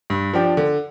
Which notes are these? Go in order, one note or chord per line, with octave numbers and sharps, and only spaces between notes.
G2
F3 D4 G4
D3